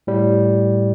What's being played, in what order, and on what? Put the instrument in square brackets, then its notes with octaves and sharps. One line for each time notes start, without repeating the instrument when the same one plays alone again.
[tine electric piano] A2 G3